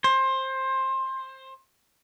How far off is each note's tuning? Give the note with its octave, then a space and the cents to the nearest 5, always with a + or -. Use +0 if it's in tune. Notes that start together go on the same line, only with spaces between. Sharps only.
C5 +20